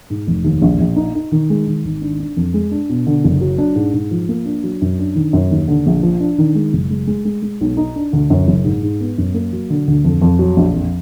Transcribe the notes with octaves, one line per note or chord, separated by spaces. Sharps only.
G#2
F1
D#2
A#1
A#1
D#4
D#4
D#3
G#3
D#3
G#1
D4
D4
F2
G#3
D4
B2
D3
F#1
F#3
D4
G#2
G#2
F3
A#3
D4
F#3
F#2
D4
D#3
F#2
D#2
D3
A#1
F3
D4
D#3
G#3
F#1
G#3
G#3
G#3
G#3
B1
D#4
D4
D2
F#2
F#1
G#2
G#2
B3
F#2
A#3
F#3
D3
D2
F2
F2
F#3
A#1
F2